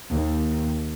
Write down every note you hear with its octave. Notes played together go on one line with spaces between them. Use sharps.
D#2